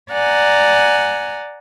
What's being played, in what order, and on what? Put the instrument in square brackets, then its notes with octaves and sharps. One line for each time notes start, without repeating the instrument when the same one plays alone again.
[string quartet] D5 F#5 G#5 A#5